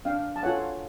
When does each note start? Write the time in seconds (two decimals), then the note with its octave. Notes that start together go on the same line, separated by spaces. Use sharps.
0.05 D4 F5 G5
0.36 A5
0.43 F4 A4 C#5 F#5 G#5